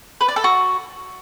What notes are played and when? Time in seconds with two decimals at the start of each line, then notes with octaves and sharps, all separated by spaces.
0.21 B4
0.28 D5
0.36 A4
0.44 F#4